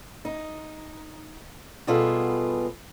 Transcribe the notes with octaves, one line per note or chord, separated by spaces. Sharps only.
D#4
B2 G3 B3 F4 G#4 A4